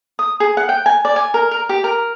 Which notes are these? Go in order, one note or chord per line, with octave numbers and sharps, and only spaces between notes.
D#6
G#4
F#5
G5
G#5
D5
G#5
A#4
A#4
G4
A#4